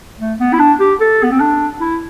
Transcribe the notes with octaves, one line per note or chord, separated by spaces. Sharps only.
A3
B3
E4
D4
G4
A4
B3
C4
D4
E4